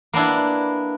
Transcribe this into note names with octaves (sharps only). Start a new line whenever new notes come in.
A#3 B3 D4 E4